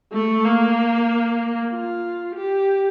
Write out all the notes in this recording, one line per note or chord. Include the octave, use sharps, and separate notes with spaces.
A3
A#3
F4
G4